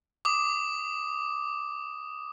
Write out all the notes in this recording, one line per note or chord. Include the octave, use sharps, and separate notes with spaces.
D6 D#6